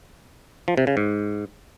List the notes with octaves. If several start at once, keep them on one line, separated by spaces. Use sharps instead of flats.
F3
C3
C#3
G#2